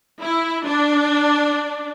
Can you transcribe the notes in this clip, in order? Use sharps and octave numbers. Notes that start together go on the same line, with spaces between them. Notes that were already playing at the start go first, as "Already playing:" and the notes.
E4
D4